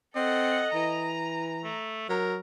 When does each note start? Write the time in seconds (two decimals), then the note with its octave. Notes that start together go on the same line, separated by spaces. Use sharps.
0.15 C4 A4 D#5 F#5
0.74 E3 A#5
1.64 A3
2.09 F#3 A#4